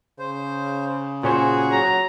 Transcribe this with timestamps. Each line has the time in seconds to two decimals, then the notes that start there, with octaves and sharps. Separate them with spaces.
0.19 C#3 C5
1.23 A#2 C#4 F#4 G#4 C5
1.72 F#3 A#5